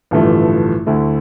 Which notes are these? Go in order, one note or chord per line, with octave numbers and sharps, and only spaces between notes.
A1 G2 D3 F3 A3
D2 D3 A3 E4